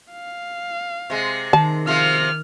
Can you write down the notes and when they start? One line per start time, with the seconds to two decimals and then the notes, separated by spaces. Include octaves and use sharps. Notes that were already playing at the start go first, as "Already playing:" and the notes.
0.12 F5
1.10 C3 G#3
1.53 D#3 A5
1.87 C3 F3 F6